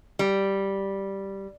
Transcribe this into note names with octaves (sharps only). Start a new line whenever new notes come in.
G3